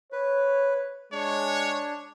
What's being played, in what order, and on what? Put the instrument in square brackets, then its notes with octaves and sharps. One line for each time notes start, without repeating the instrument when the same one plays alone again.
[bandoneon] B4 [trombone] C#5
[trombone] G#3 [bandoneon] D4 [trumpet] C#5